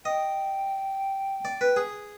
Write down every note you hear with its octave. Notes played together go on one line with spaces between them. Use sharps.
D#5 G5
D5
B4
G#4